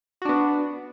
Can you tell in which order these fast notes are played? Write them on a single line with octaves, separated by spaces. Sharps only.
F#4 D4 B3